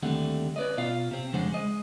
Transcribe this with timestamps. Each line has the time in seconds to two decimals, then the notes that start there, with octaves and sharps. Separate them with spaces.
0.02 D#2 D3 G3 A3 C4 F#5
0.56 C#4 B4 D5 D#5
0.77 B2 F4 F5
1.11 C3 C4
1.33 F2 C#3 G#3 D4 C5 F#5
1.53 G#3 D#5